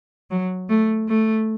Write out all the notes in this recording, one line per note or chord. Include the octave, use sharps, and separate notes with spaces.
F#3
A3
A3